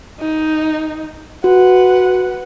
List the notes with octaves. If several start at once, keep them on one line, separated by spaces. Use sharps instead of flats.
D#4
F#4 B4 F#5